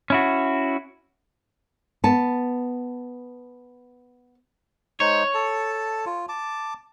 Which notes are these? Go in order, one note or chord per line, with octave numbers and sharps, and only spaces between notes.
C#4 E4 F#4
B3 A5
G#3 D#4 C5 C#5
A4 A5
F4
A5 D6